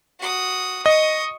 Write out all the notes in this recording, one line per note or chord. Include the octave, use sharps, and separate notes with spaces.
F#4 D#6
D#5 C#6 D#6